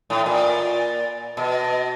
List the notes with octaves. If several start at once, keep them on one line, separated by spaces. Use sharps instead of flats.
A2
A#2
B2